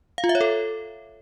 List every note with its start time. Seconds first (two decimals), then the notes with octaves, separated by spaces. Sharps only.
0.18 F5
0.24 F4
0.29 E5
0.35 C#5
0.41 A4